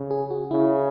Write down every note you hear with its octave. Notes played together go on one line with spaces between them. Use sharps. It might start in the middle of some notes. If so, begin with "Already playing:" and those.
Already playing: C#3
G#4
F#4
C#3 E4